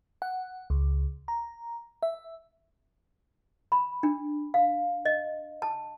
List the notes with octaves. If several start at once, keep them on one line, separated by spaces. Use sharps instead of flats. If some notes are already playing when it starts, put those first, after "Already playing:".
F#5
C#2
A#5
E5
B5
D4
F5
D#5
A5